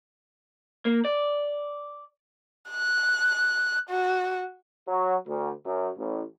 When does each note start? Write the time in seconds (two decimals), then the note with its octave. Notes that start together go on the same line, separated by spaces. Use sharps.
0.85 A#3
1.05 D5
2.70 F#6
3.90 F#4
4.88 F#3
5.28 D2
5.66 F#2
5.98 A1